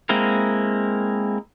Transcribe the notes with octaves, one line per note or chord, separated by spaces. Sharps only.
G#3 A#3 C4 E4 A#4